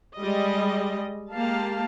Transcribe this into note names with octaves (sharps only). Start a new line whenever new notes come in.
G3 G#3 D#5
G#3 A#3 G4 F5 A5